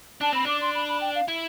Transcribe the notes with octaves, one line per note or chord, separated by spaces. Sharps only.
D4 A5
C4 B5
D4 D6
C6
B5
B5
G5
F5
E4